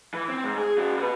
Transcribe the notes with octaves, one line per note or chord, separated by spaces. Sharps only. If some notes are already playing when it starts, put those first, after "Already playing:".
E3
C4
G#2
G#4
C#3 F#4
F#4 B4